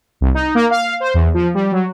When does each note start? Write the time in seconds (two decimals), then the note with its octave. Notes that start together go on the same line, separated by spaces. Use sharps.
0.21 C2
0.35 D#4
0.55 A#3
0.71 F5
1.00 C5
1.14 E2
1.34 F3
1.55 G3
1.72 F#3